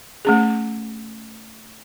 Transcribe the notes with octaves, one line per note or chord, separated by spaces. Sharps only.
A3 C#4 G#4